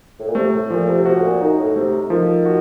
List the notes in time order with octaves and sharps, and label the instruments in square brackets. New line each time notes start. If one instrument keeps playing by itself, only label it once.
[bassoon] A2
A#2
[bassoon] C3 [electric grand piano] A3
[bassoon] A2
[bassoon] A#2 [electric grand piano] F3
[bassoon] C3
[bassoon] C3 [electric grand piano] F#4
[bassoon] A2
A#2
[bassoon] F#2 [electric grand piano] D#4
[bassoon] A2
[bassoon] C3 [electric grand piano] A3
[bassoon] D#3 [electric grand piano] F3
[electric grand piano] F#4